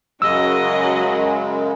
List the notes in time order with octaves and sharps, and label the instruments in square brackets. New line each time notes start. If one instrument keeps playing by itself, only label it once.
[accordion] F#2 C#3 G#3 [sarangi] F#3 [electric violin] F#4 D#5 [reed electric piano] E6